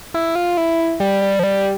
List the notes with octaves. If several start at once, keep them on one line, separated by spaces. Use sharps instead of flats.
E4
F4
E4
G3
G3
F3
G3